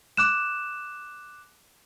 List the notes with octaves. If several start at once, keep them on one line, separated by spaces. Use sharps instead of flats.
D6 F#6 E7